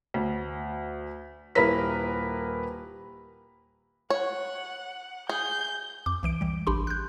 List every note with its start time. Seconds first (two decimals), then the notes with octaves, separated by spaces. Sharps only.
0.14 D2
1.55 D#1 E4 A#4 B4 B6
4.10 C#5 F#5
5.29 G#4 G6
6.06 F2 D6
6.23 C2 E3 D7
6.41 E3 G3
6.67 A1 D4 G4 B5 C6
6.87 F#6 G6